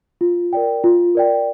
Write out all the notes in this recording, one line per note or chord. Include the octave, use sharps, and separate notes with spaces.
F4
A#4 D5 G5
F4
A#4 D5 G5